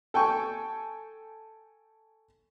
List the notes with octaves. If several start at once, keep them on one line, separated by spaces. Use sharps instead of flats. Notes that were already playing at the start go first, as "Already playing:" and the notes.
A4 G5 G#5 C#6